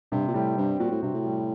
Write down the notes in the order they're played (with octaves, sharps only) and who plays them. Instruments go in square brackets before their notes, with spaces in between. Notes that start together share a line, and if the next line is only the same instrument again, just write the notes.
[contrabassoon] G2 [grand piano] C3
[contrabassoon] A#2
[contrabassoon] A2 [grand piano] G3
[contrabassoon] G2 [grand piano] C4
[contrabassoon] A#2 [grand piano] F#4
[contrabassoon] A2
[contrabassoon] G2 [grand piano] C3
[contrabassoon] A2
[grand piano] G3